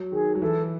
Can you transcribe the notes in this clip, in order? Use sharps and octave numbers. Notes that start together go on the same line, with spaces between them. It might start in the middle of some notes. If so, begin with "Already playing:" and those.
Already playing: F#3
D#3 G#4
F#3
E3 A4